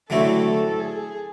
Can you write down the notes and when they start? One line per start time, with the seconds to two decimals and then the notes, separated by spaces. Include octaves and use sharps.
0.10 D3 F#3 A3 C4 E4 A4
0.80 G#4